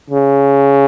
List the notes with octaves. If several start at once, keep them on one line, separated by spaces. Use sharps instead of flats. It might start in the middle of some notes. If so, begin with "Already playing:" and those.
C#3